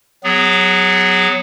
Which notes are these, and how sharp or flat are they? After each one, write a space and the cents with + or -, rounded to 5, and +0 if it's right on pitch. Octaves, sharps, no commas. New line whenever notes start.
F#3 +0 B3 +25 G#4 -25